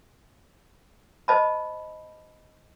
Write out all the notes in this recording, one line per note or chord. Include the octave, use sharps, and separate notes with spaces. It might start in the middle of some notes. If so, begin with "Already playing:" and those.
C5 D#5 A5 B5